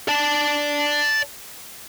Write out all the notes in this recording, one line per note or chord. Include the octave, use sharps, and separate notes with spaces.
D5 A5